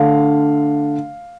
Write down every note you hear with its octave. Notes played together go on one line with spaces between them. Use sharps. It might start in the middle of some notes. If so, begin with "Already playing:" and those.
Already playing: D3 A3 D4 F5